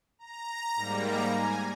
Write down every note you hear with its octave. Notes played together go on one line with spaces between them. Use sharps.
A#5
G#2 G3 A#3
A#5
G#5